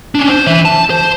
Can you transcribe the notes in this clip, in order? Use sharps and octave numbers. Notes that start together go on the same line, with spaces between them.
C#4 D4
C5
E3 E5
A5
C5